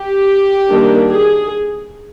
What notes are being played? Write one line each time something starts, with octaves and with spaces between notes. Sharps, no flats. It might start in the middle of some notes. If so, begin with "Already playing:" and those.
Already playing: G4
D#3 G3 A#3 D4
G#4